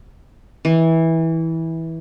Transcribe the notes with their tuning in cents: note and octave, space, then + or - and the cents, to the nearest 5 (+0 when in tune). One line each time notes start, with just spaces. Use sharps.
E3 -15